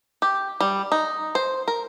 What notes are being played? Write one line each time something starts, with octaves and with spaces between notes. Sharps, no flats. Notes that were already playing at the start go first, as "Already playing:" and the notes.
G4
G3
D#4
C5
A#4